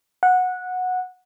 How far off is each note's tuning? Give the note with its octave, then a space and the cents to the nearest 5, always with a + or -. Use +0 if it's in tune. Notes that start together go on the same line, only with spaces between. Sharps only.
F#5 -15